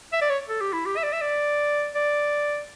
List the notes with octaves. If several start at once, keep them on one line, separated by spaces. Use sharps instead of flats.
E5
D5
C#5
A4
G4
E4
G4
E5
D5
E5
D5
D5